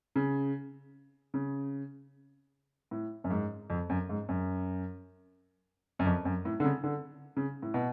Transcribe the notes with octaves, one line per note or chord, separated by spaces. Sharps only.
C#3
C#3
A2
F#2
G#2
F2
F#2
G#2
F#2
F#2
F2
F#2
A2
D3
C#3
D3
C#3
A2
B2